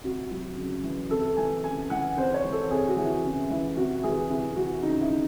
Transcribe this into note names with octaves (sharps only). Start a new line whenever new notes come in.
C3 F#4
F#3
C#3
E3
C3 A4
E3 G#5
C#3 G#5
E3 F#5
C3 C5
C#5
E3
A4
C3 G#4
F#4
E3
E4
C#3
E3 E4
C3 F#4
E3 G#4
C3 E4
E3 F#4
C#3 D#4
E4
E3